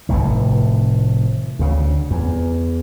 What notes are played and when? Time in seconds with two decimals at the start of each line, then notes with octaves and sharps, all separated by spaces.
0.09 F1 C2 A2 D#3
1.59 D2 C#3
2.11 E2